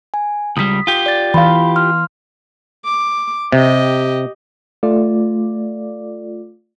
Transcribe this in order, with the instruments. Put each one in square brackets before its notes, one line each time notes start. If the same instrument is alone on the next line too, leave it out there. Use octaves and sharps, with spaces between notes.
[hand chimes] G#5
[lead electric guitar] C#2 G3 [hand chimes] D#6 B6
[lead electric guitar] F4 G4
[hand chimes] D5 A6
[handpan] E3 F5 [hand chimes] B5 C6
[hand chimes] C6 F6
[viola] D6
[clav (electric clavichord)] C3 [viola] G4 D#5
[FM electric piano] A3 F4 D5